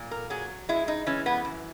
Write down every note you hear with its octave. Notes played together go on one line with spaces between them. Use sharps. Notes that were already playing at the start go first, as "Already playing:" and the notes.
Already playing: A#2
A#4
F#3 G#4
G#3 E4
D#4
E3 C#4
B3
F#2